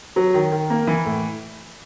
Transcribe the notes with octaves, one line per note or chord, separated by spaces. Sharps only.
F#3
D#3
D#3
A#3
E3
A2